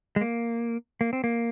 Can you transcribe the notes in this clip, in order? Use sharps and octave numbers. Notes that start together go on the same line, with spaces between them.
G#3
A#3
A#3
C4
A#3